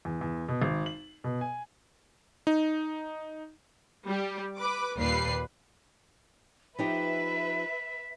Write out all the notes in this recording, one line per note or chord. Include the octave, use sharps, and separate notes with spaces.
E2
E2
B2
G#1
F#7
B2
G#5
D#4
G3 G4
B4 D6
D#2 A#2 G3 B4 C7
F3 D#4 G4 B4 E5 B6